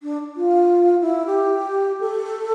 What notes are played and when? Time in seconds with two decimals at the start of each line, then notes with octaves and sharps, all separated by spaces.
0.03 D4
0.37 F4
1.01 E4
1.26 G4
2.00 A4